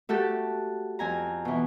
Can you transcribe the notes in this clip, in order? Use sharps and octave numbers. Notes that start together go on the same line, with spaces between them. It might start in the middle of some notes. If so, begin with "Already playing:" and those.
A3 F#4 G4 A4
F2 G#5 A#5
B2 E3